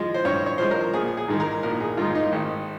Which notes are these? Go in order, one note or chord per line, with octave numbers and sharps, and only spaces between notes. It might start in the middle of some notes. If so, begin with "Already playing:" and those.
Already playing: F3 G#3
C5
G2 C#5
C#5
F3 G#3 C5
A#4
A#1 G#4
G#4
G#2 D#3 G#3
A#4
A#1 A#4
G#4
G#2 D#3 G#3 F4
D#4
G#1